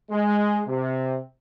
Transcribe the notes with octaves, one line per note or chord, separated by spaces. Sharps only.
G#3
C3